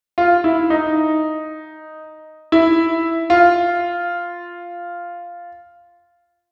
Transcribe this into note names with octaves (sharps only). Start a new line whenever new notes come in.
F4
E4
D#4
E4
F4